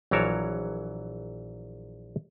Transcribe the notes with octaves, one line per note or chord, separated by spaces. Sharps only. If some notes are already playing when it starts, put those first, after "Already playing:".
A#1 E3 F#3 A#4 C#5 A5